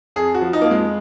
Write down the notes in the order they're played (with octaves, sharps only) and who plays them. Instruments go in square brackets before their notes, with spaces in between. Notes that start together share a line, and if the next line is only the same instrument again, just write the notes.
[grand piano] F2 G#4
F#4
F3
D#4
F2 A#3
G#3